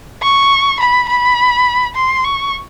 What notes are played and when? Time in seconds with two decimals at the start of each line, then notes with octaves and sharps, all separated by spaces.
0.22 C#6
0.80 B5
1.09 B5
1.95 C6
2.24 C#6